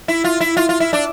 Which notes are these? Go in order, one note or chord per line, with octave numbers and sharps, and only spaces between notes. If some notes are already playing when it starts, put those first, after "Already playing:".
E4
F4
E4
F4
F4
E4
D4